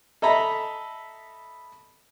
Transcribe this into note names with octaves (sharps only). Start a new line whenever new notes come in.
A4 D#5 E5 A#5 B5